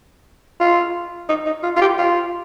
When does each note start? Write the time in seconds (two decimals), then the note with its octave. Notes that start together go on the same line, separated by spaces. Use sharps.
0.60 F4
1.29 D#4
1.46 D#4
1.63 F4
1.76 F4
1.81 G4
1.98 F4